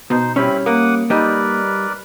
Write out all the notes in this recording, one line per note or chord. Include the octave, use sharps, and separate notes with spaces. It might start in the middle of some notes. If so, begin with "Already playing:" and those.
B2 D#4 C5
G3 C4 C#4 E4 B5
A#3 F#5 D6 D#6
G3 D#4 A#4 B4 D5 D#5